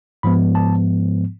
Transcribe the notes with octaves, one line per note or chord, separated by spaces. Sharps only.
G#2 F3 G#3 B3 B5
A5